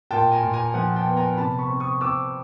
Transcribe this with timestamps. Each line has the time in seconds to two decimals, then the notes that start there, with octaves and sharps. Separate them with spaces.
0.11 A#2 G5 A5
0.32 G#5 A#5
0.42 A#2
0.53 G#5 A#5
0.74 F3 F#5 G#5
0.96 G5 A5
1.07 B3
1.17 G#5 A#5
1.37 C3 A5 B5
1.59 B5 C#6
1.69 C4
1.80 C#6 D#6
2.01 C4 D6 E6